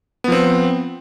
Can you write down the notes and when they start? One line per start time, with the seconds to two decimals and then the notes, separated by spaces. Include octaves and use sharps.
0.24 B3
0.28 F3
0.32 C4